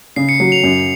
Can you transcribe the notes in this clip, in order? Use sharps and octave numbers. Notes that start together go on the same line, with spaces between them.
C#3 C7
C#7
F#3
F7
F#2